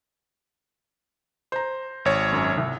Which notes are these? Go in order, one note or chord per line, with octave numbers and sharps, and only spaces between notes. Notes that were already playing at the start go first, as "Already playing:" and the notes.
C5 A#5
G#1 C#5
F#2
C2